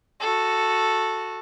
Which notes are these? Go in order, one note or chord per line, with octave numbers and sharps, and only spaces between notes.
F#4 A4